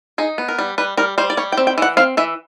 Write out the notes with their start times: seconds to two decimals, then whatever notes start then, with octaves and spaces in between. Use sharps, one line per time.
0.18 D#4 G#4
0.38 B3
0.48 A#4
0.59 G3
0.78 G3 B4
0.97 G3 A#4
1.18 G3 C5
1.30 D5
1.37 G3 C#5
1.52 G5
1.58 C4
1.67 G5
1.78 E3 F#5
1.97 C4 F5
2.17 E3 E5